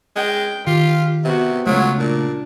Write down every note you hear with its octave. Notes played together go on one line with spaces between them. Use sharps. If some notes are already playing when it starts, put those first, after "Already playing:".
G#3 G5
D#3 F4 G4
C3 B3 F#4
C#3 F#3 G#3 A3 F4
A#2 D4